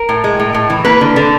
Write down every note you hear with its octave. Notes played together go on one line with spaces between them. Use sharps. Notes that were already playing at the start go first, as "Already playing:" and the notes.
Already playing: A#4
A2
G#3
A2
A2
E3
A#3 B4
D3
D3